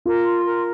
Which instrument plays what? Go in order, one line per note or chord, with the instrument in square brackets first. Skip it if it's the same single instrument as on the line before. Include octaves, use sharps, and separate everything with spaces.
[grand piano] F4 [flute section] A#4
[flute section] C6
A#4